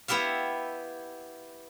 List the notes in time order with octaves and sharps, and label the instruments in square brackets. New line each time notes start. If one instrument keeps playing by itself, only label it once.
[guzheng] B3 E4 G4 E5 F5